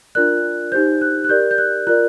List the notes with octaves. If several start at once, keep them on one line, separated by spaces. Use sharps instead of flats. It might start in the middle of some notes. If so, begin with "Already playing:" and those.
D4 F4 A#4 D5 F#6
D#4 G4 C5 G6
F#6
F#6
G4 A#4 D5 G6
G6
F#6
F4 A#4 D5 F#6